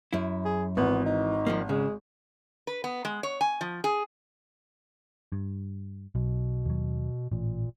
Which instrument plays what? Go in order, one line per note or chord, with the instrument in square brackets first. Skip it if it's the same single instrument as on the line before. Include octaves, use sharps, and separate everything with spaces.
[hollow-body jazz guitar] F#2 E4
[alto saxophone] G#4
[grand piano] G#1 [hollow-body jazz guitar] E3 [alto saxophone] B3
[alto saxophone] D#4
[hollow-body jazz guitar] F3 G3 A#3
[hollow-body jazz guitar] C#3 [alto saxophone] G#3
[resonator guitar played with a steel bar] B4
B3
G#3
C#5
G#5
F3
G#4
[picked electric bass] G2
[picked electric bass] B1 [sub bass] B2
[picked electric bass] D#2 F#3
[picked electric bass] A1 [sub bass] A#2